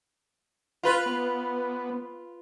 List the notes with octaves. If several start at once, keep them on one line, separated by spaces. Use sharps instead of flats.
F4 B4
B3